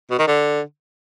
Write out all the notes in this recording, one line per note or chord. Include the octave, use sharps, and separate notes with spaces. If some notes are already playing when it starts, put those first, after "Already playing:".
B2
D#3
D3